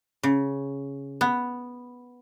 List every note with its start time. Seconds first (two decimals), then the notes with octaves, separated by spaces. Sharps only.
0.23 C#3
1.21 B3